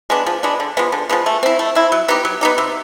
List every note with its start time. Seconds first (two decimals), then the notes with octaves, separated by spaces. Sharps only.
0.10 G#3 B3 D4
0.26 F3
0.43 G#3 B3 D4
0.60 D3
0.77 F3 G#3 B3
0.92 D3
1.09 F3 G#3 B3
1.26 A3
1.43 C4 E4
1.59 A3
1.75 C4 E4
1.92 F#3
2.08 B3 D#4 G4
2.25 F#3
2.41 B3 D#4 G4
2.58 C3